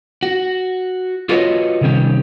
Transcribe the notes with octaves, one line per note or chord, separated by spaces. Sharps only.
F#4
F4 F#4 A4 B4 C#5 D#5
C3 D#3 G3 C#4 G4